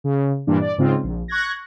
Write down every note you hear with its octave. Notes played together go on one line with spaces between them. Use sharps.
C#3
G2 A#2 E3 D4
D5
G#2 C#3 C4 F4
A#1
C#6 F#6 G#6 A#6